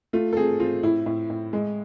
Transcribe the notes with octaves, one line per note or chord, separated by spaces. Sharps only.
A3 F4
A4
C4 G#4
C4 F4
A2 E4
A2
A2
G#3